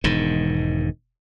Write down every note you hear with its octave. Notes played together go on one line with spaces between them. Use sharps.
E1 G#2 D#3